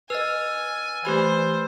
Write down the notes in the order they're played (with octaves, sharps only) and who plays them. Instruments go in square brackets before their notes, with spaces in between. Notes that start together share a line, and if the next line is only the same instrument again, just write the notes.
[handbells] B4 D#5 [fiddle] G#5 [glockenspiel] E6 F6 A6
[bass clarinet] E3 [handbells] A3 G4 G#6 [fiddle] C5 [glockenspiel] B5